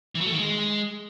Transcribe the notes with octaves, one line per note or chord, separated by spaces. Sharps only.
E3
F#3
A3
D#3
G#3